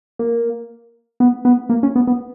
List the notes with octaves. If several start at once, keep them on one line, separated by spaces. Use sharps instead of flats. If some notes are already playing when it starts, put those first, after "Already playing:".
A#3
B3
B3
A#3
C#4
B3
B3